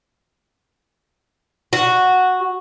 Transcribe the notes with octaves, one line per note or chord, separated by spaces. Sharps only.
F#4